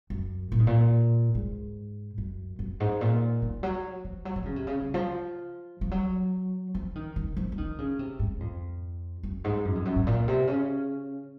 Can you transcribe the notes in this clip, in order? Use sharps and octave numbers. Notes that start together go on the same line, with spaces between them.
F#2
A#2
G#2
A#2
G#2
F#2
F#2
G#2
A#2
D#3
F#3
F3
F#3
F3
C#3
C3
C#3
C#3
F3
F3
F#3
F3
D#3
D#3
F3
F3
D#3
C#3
C3
G#2
F2
F#2
G#2
F#2
F2
F#2
G#2
A#2
C3
C#3